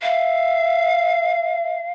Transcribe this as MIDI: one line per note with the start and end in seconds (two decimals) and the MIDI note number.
0.02 1.75 76
0.02 1.92 77